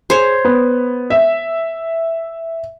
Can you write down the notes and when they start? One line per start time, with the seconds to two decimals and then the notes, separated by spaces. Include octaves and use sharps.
0.10 G#4 C5 C#5
0.45 B3
1.10 E5